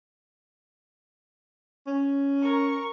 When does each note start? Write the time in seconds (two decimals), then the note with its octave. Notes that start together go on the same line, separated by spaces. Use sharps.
1.87 C#4
2.43 A#4 C#6